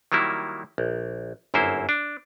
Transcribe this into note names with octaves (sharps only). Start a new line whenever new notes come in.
D#3 F#3 G3 A#3 E4
A#1
G1 F#2 A#3 E4 C5
D4